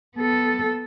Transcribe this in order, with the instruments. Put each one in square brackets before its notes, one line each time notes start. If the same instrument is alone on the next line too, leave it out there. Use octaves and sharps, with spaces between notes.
[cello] B3 A4